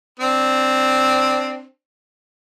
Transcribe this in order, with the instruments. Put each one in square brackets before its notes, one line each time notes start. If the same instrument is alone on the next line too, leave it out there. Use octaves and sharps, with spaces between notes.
[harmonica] C4 D4